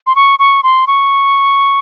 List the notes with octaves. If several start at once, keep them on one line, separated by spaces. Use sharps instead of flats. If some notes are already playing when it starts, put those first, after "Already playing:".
C6
C#6
C#6
C6
C#6